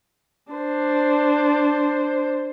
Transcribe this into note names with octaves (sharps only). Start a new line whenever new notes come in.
D4 C5